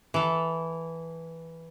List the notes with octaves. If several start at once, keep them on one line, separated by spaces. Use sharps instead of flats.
E3 A4